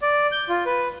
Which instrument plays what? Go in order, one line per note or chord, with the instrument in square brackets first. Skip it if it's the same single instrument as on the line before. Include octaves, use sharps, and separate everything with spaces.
[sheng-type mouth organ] D5
G6
F4
B4